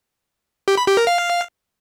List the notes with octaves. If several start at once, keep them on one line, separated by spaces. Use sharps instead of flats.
G4
B5
G4
A#4
F5